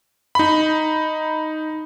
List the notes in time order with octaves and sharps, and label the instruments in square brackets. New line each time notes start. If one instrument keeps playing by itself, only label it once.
[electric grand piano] D#4 B5